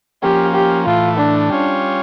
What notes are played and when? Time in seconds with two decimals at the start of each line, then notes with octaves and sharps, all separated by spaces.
0.23 F3 A#3 C#4 G4
0.55 G4
0.86 A2 E3 A3 F4
1.18 D4
1.50 G3 C#4 F4 C#5